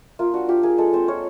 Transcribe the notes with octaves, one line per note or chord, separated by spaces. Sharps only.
A#3 F4
D4 F#4
F4 G4
A#3 G#4
G#3 A4
C4 C5
F4 C#5